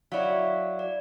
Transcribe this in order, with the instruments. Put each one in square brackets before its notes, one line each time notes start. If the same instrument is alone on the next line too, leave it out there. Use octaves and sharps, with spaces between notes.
[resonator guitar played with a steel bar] F#3 E4 [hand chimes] D5 F5
[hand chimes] D5